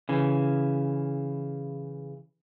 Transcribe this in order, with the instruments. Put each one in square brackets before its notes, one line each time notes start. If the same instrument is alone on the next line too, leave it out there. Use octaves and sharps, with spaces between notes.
[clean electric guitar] C#3 E3